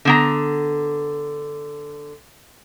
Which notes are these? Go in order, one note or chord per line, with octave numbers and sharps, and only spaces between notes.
D3 B3 A#5